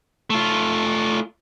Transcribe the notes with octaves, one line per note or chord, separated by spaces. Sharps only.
A3 F4